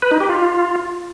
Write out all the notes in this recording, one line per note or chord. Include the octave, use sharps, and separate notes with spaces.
B4
D#4
G4
F4